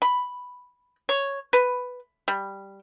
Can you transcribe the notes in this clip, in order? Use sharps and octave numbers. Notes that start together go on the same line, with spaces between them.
B5
C#5
B4
G3